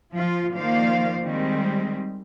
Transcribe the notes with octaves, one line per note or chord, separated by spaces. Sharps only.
F3 F4
D#3 F3 A#3 C5 D5 F5
D#3 G3 G#3 C4